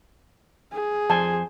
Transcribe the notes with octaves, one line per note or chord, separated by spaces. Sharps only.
G#4
F2 C5 G#5 A5